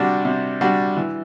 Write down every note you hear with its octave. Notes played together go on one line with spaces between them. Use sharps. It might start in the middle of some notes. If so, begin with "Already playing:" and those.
Already playing: C3 G3 D4 F#4
C3
G3 D4 F#4
E3